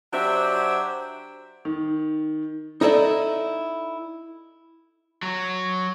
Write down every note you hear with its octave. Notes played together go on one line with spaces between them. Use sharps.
F#3 D4 G4 C5 E5
D#3
D#4 E4 A4 D5 D#5
F#3